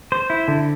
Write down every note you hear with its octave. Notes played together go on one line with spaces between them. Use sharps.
C5
E4
D3